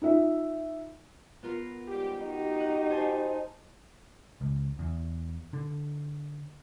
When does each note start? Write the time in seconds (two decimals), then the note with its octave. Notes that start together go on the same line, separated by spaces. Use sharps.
0.02 D#4 F4 E5
1.43 B3 F4 A#4
1.87 G#2 G3 G4
2.21 D#3 D#4 F#4 G4
2.60 F#5
2.90 C5 G#5 A5
4.41 C#2
4.79 E2
5.53 D3